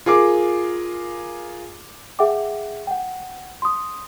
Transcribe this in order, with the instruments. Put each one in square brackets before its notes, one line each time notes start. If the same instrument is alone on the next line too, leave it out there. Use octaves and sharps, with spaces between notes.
[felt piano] F4 G#4 A#4 D6
[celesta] G#4 E5 F#5 G5 D6
F#5 G5
C6 D#6